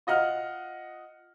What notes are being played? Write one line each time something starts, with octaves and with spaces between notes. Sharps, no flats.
F4 D#5 F#5 F6